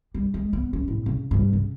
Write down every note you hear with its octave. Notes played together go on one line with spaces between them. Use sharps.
G3
G#3
B3
C#4
A2
C#3
G2
C#3